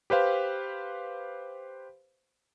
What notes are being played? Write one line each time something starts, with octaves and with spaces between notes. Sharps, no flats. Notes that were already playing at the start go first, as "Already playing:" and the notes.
G4 B4 C5 F5